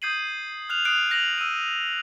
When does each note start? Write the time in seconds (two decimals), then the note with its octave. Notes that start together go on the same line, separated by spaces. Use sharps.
0.02 D#6 G6 G#6 C7 D#7 F#7
0.69 F6 F#6 F7
0.85 D#6 F#6 C7 D7 F7
1.11 F#6 A#6 D7 F7 F#7
1.38 E6 D#7